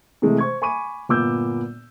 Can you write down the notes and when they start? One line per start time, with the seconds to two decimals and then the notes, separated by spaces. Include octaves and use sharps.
0.22 C3 E3 G#3 A3
0.38 C5 C#6 G#6
0.62 G#5 B5 C#6 D6 D#7
1.09 G1 A#2 B3 D6 E6 G6